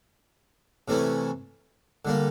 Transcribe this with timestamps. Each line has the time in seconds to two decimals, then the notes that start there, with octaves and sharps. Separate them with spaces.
0.88 C3 E3 A3 C#4 E4
2.05 D3 G3 A#3